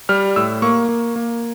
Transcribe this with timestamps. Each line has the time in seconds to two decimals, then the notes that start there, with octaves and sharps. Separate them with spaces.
0.09 G3 F6
0.36 A2 E6
0.62 A#3 C#6
0.89 A#3
1.16 A#3